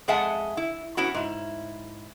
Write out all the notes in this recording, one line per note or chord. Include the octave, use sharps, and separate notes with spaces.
F2 G#3 E5 F#5 G#5 A5
E4
B3 C#4 E4 F#4
G#2 E4